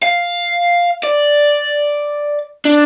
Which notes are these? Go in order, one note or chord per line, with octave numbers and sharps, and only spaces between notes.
F5
D5
D4